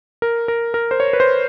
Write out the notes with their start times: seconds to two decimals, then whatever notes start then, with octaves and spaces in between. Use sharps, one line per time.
0.22 A#4
0.48 A#4
0.74 A#4
0.91 C5
1.00 C#5
1.13 B4
1.20 C5